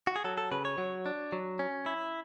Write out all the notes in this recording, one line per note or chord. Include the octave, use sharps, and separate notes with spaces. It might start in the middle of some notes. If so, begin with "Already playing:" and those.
F#4
G#4
F#3 A4
A4
C#3 B4
C#5
F#3
D4
F#3
C#4
E4